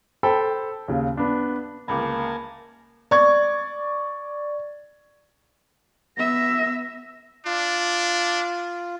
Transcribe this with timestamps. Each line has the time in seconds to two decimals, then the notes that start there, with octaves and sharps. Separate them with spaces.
0.23 A4 C5 G5 B5
0.88 D#2 C#3
1.17 B3 D4
1.88 G1 C#2 A#3 A#4 G#5 A5 B5 D6
3.11 D5 C#6 G#6
6.17 B3 E5 A#6
7.46 D4 F4